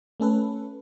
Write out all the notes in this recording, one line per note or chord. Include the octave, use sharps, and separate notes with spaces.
A3 C#4 A4 B4